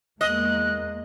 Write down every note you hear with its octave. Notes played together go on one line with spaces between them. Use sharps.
E2 G#3 A#3 D#5 F#6